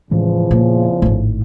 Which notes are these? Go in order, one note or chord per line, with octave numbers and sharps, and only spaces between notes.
E2 A2 C#3 E3 F3 G#3
A#2 A#3
G#1 A2 A3